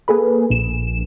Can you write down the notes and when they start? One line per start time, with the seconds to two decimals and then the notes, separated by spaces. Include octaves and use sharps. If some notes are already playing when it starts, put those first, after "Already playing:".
0.08 A#3 G#4 A4 B4
0.50 A#1 E7